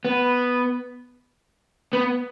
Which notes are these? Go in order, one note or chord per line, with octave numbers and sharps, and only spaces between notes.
B3
B3